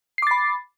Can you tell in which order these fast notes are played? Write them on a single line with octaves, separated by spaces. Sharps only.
C7 D6 A6 B5